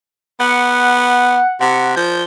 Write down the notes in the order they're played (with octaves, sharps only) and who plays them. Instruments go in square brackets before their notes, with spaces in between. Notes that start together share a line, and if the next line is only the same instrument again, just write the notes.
[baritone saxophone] B3 [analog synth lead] F#5
[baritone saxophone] C3 [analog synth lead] F#5
[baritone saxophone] F3 [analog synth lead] G6